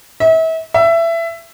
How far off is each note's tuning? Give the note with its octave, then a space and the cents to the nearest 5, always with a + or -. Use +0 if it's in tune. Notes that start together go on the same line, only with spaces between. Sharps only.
E5 -35
E5 +20